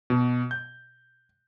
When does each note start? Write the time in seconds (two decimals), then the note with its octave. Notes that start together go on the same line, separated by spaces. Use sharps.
0.10 B2
0.51 G6